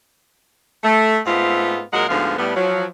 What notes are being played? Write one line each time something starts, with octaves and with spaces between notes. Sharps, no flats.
A3
G#2 A3 B3 C4 F4
A#2 F#3 G#3 D#4 A#4 F#5
D2 G#2 D3 F3 B3 F5
A2 G3 B3
F3 F#3